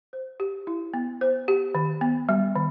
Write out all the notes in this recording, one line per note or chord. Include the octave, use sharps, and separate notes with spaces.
C5
G4
E4
B3
C5
G4
D#3
B3
G3
D#3